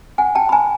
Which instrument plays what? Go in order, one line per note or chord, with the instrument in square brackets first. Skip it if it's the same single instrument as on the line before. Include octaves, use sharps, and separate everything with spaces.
[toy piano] F#5 G#5
G5 A5
B5
G#5 A#5